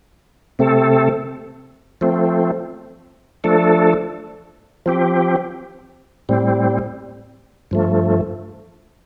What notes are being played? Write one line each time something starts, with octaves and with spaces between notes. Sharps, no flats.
C3 A3 C4 A4
F3 A3 C4
F3 A3 D4 A4
F3 C4 G4
A2 G3 C4
G2 F3 A3